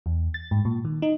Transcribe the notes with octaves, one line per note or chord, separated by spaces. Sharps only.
E2
A6
G#2
A#2
D#3
D#4